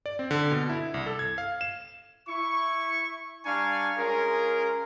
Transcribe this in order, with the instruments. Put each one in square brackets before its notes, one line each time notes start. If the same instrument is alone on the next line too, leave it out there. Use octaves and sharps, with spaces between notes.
[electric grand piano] D5
C4
D3
B2
E4
C2
A4
G#6
F5
E7
[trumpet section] E4 C#6
G3 D4 F5 G#5 A#5 C#6
G#3 C#4 F4 G#4 A#4